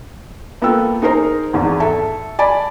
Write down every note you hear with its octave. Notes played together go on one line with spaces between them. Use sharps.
A#3 B3 F4 A4 G5 E6
D#4 G#4 A#4 C5 A#5
G#1 E2 G#2
A4 E5 A5
D5 G#5 A5 B5